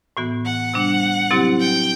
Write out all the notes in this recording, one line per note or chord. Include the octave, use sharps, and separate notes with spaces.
A2 E3 B3 F#4
F#5
C3 G3 D4
C3 F#3 C4 E4 G4
G5